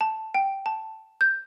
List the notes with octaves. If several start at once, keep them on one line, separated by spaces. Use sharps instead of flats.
A5
G5
A5
G6